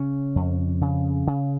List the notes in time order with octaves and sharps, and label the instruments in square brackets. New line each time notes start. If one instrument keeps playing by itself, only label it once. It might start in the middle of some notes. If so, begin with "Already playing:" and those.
Already playing: [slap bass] C#3 C#4
F2
C#3
C#3